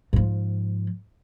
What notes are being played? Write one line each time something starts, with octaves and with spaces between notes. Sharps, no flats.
G#2 F3